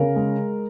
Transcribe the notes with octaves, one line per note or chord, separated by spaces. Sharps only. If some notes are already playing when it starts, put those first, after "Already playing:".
Already playing: C#3 A#4
G#3